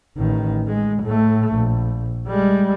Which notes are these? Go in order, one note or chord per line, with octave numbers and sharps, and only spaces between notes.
A1 D#3
G#3
A2 A3
A#1
G3 G#3